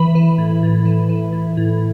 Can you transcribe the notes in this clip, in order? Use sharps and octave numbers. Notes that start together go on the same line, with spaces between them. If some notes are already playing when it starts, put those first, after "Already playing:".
Already playing: E3 B5
E3
A2
A2
E3
E3
A2
A2